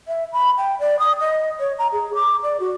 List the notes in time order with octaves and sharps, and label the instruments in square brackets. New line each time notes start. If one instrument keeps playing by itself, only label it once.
[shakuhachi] E5
B5
G5
D5
D#6
D#5
C#5
A#5
G#4
D6
D5
F#4